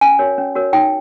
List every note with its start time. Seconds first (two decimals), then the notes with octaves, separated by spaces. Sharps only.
0.01 C#4 G#5
0.19 F#4 A#4 C#5
0.38 C#4
0.55 F#4 A#4 C#5
0.73 D#4 G5